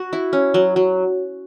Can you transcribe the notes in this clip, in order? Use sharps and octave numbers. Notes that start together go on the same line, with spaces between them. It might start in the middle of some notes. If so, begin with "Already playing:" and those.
Already playing: F#4
E4
C#4
F#3
F#3